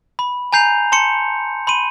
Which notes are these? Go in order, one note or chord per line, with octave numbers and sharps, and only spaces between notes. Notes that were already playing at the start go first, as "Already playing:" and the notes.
B5
G#5 A#5 G6 C7 F7
A5 C6 C#7
B5 C6 D#7